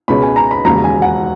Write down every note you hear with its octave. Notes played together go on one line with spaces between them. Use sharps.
C#2 B2 G#3 C#4 B5
G#5
A#5
B5
E1 D#2 C#3 A#5
G#5
F#5